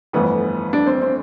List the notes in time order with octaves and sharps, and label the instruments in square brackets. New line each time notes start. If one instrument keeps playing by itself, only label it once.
[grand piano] G1 F2 E3 A3 [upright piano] B3
[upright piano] D4
C4
C4